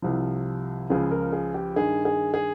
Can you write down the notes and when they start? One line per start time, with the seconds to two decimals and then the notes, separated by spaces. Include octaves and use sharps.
0.02 C2 C3 F3
0.90 C#2 C#3 F3 G#4
1.11 A#4
1.32 G#4
1.54 G4
1.76 G2 D#3 G#4
2.05 G#4
2.34 G#4